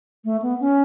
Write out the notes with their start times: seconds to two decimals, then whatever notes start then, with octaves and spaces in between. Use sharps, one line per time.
0.25 A3
0.42 B3
0.60 C#4